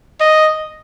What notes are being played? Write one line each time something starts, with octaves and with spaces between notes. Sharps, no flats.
D#5